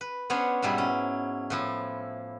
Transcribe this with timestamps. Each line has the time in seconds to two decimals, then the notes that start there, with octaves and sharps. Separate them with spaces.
0.01 B4
0.30 B3 C#4 D4 C5 C#5
0.62 G#2 B2 F#3 G3 B3 E4
0.78 C#4
1.50 A2 F3 E4